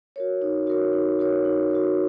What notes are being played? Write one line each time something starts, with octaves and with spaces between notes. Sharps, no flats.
F#4 A#4 C#5
D#4
F#4 A#4 C#5
D#4
F#4 A#4 C#5
D#4
F#4 A#4 C#5